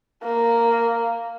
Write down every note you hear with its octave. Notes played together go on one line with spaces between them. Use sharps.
A#3